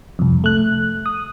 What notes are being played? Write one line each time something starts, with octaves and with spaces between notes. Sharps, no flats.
C2 F2
A3 F#6
D#6